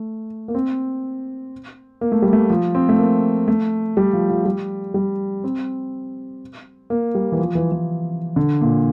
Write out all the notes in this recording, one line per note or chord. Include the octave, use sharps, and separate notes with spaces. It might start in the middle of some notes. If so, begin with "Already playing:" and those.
Already playing: A3
A#3
C4
A#3
A3
G3
A3
F3
C4
A3
A#3
A3
G3
F3
F3
G3
G3
C4
A#3
G3
E3
F3
E3
E3
D3
A#2